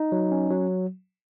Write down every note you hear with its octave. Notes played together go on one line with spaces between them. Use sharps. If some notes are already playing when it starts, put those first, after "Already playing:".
Already playing: D#4
F#3
C#4
F#3